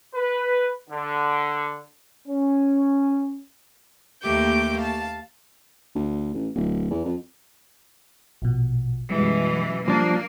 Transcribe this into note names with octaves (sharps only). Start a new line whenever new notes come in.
B4
D3
C#4
D#2 A3 A#3 G4 D6 G6
F5 A5
D2
A1
D1
E2
F2
A#1 B2
F#2 B2 E3 G3 G#3
F3 G3 A#3 D4